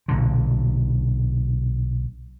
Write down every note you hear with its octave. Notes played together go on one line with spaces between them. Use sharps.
B1 A#2 D3